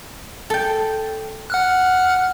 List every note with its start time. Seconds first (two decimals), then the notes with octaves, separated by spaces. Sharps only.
0.50 A4 G5
1.50 F#5 F6 F#6